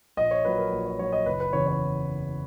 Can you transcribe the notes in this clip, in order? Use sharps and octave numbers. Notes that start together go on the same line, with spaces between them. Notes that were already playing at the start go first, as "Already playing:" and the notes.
A#1 D#5
C#5
A#2 F#3 B4
A#4
A#1
C#5
A#2 F#3 C#5
D#5
F#1 B4
B4
E2 C#3 E3 C#5
C#5